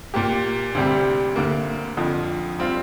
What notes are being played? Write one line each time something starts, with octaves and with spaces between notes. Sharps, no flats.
A#2 A#3 G4
D2 C3 G3 C4 G4
D2 D3 A#3
F2 D3 F3
G3 C4 F4